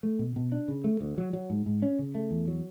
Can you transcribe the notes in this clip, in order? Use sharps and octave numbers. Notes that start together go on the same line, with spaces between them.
A3
B2
B2
D4
C#3
A3
D2
F#3
F#3
G#2
G#2
C#4
C#3
A3
E2
F#3